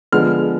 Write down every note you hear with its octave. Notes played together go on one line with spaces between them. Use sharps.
D3 F3 G#3 B3 F6